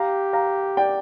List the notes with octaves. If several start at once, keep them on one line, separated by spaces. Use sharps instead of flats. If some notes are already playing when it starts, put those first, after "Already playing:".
Already playing: G4 F5 A#5
F5 A#5
D5 G5